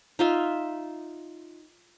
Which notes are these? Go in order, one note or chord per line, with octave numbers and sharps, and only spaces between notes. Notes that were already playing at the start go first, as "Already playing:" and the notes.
D#4 F4 E5